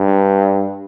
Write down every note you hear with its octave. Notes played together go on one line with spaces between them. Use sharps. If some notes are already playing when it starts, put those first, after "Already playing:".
Already playing: G2